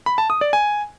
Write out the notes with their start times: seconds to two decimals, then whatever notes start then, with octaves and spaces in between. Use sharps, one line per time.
0.06 B5
0.18 A5
0.30 D#6
0.41 D5
0.53 G#5